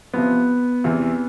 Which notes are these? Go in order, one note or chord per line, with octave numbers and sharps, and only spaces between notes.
C3 F3 B3 C4
E2 C3 E3